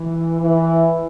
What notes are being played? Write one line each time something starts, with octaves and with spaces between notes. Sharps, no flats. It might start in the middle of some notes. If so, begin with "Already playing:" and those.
Already playing: E3
E3